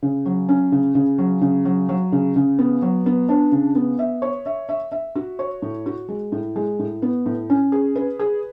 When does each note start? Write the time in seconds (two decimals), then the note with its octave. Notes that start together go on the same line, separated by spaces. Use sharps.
0.02 C#3
0.25 F#3
0.49 C#4
0.72 C#3
0.95 C#3
1.18 F#3
1.41 C#3
1.65 F#3
1.89 F#3
2.12 C#3
2.36 C#3
2.59 B3
2.82 F#3
3.06 B3
3.29 D4
3.52 C#3
3.75 B3
3.99 E5
4.22 C#5
4.46 E5
4.69 E5
4.92 E5
5.15 F#4
5.39 C#5
5.62 A2
5.86 F#4
6.09 G#3
6.32 A2
6.56 G#3
6.79 A2
7.02 B3
7.26 A2
7.50 C#4
7.72 G#4
7.96 B4
8.19 G#4